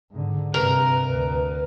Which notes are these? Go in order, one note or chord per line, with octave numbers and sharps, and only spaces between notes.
G#2 D3
G2 C3 A#4 B4
D2